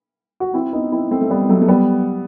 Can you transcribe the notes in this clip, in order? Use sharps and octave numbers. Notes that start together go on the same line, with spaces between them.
F#4
C4 E4
B3 D#4
C4 E4
A3 C4
A3
G3 B3
F#3 A3
A3
G3 B3